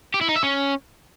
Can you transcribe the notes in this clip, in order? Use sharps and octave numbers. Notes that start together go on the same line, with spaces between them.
G4
E4
D#4
E5
C#4